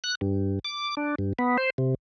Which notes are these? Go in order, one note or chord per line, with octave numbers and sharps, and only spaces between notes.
F#6
G2
D6
D4
G2
B3
C5
C3